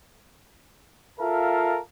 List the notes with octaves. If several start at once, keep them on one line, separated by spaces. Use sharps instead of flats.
F4 A4 A#4 E5 F5 A5